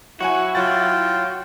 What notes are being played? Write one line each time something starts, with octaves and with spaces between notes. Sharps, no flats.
F#3 E4 F#4 F#5 G#5
F#3 F4 G5 A6